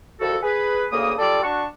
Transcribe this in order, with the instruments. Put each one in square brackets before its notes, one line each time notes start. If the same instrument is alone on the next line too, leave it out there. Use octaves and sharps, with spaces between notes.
[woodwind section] C2 F2 F#4 A4
G#4 B4
D2 C#3 A#3 A#4 D#6
G3 D4 F4 A4 D5
D4 F#4 A5 C#6